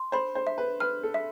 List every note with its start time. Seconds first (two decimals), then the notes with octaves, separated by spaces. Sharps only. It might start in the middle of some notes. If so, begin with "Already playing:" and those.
Already playing: C6
0.12 C5 B5
0.35 C5
0.47 E5
0.58 B4
0.80 B4 F6
1.03 A4
1.14 E5